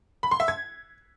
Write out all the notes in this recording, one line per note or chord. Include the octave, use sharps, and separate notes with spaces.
B5
C6
E5
G#6